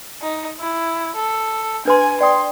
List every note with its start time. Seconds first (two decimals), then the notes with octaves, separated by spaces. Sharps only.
0.22 D#4
0.59 E4
1.15 A4
1.85 D4 B4 G#5 C6
2.21 D5 G5 C6 D#6